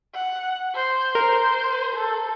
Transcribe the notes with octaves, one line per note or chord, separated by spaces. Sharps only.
F#5
C5
A#4 C5
A4